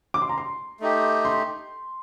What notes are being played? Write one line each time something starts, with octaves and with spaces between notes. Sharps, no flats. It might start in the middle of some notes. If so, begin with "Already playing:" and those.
D6
C6
A#5
C6
A3 D#4 G4
C6